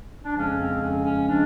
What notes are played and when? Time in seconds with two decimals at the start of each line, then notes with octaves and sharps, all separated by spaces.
0.24 D4
0.35 F2 C#3 F3 G#3 C#4
0.58 C4
0.81 C#4
1.04 C#4
1.28 C#3 F3 G#3 D4